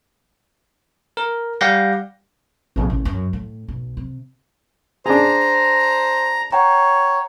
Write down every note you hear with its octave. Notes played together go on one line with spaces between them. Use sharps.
A#4
G3 G4 F5 F#5 G6 A#6
A#1 C3
A1
F#2
A2
B1
C3
D4 G#4 C5 A#5
C#5 F#5 G5 A#5